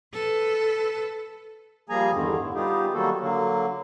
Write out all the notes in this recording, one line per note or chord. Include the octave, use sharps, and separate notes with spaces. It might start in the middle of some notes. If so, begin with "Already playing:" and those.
A4 B4
F3 G3 A#3 G#4 G#5 A#5
E2 G2 D3 D#3
A2 D3
G3 B3 D#4 F4 G4 G#4
D#3 F#3 G3 A#3 F#4 A4
D3 F#3 A#3